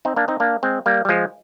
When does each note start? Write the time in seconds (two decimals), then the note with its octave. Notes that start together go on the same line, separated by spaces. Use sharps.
0.05 C4 D#4
0.16 A#3 D4
0.28 C4 D#4
0.40 A#3 D4
0.63 G#3 C4
0.86 G3 A#3
1.05 G3
1.09 F3 G#3